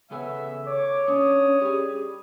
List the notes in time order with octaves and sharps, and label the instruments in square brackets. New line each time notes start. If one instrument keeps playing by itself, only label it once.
[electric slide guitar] C#3 A4 G#5 [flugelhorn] B3 [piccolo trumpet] E5
[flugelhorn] C#5 [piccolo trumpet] D6
[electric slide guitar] C#4 D4 [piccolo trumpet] D#6
[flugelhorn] G3 [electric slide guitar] G4 G#4